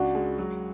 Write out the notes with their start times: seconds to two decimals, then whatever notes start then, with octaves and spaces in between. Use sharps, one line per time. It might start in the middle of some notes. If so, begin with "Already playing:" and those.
Already playing: C#2 D4 F#4
0.15 G#3
0.38 F#3